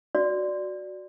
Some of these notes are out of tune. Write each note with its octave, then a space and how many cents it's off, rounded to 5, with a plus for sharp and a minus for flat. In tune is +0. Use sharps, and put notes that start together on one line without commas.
F#4 +0 D5 +0